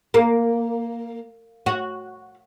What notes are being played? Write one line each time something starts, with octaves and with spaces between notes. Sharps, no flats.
A#3
F#4